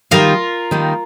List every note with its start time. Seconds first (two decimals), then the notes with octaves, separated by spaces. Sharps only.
0.11 D#3 G3 A#3 D#4 F4 A#4
0.71 D#3 G3 A#3 D#4